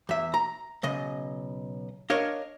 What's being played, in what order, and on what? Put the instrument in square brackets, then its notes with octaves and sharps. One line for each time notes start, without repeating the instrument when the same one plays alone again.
[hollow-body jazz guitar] E2 E5
A#5
B1 C#3 D#5
D4 A#4 C#5 D#5 F5